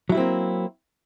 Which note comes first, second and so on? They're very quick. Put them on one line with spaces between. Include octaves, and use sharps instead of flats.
F#3 E4 G3 C4 A#3